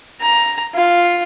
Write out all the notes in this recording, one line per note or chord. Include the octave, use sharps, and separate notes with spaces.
A#5
F4